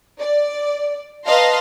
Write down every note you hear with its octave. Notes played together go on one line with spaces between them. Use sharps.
D5
B4 D#5 F5 A5 A#5 C6